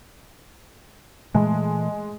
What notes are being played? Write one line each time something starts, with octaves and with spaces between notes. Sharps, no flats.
A#2 E3 G#3 A3